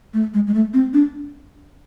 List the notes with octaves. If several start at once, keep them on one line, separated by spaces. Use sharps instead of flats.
A3
G#3
G#3
A3
C4
D4